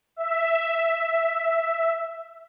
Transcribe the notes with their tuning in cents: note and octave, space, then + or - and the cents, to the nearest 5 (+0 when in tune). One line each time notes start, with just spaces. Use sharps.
E5 +5